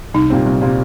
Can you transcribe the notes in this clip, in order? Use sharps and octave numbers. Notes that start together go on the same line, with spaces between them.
C2 D#4
A#2 G3 C4
C2
A#2 G3 C4